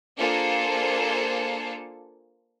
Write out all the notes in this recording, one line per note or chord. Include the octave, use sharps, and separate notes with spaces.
A#3 D4 F4 G#4 A4 C5